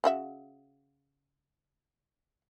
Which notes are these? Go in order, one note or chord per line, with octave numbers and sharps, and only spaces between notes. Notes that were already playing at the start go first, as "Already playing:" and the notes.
C#3 F#4 E5